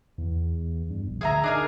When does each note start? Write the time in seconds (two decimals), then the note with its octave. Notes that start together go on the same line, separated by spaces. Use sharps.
0.18 E2
0.90 G2
1.08 A#1
1.21 D2 G#4 E5 A#5
1.44 D4 D#4 G#4 A#4